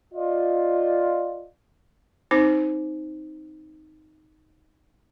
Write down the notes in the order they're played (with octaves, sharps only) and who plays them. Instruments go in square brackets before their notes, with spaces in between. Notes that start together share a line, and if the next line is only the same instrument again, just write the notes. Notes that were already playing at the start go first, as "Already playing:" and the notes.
[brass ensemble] F4 D5 D#5
[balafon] C4 D#4 C5 D6